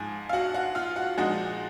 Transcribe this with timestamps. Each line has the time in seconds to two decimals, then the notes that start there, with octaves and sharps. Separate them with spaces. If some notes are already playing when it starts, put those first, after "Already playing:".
Already playing: G#2 F3 G#5
0.29 F5
0.33 F#4 F#5
0.54 F#4 F#5
0.75 F4 F5
0.96 F#4 F#5
1.17 A#2 F3 G#3 D#4 F#4 F#5